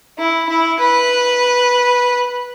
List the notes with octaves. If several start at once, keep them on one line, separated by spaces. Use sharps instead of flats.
E4
E4
B4